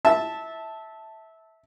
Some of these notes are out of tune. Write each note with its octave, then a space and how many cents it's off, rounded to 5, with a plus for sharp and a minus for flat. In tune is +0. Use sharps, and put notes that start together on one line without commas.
E5 -20 A5 +0